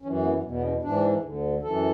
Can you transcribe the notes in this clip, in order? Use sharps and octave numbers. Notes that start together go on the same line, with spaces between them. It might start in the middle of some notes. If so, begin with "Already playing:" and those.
F#2 E3 C#4
B3
E2 B2
B3
C#4
G#2 E3 D4
D2 D3
F#2 E3 A4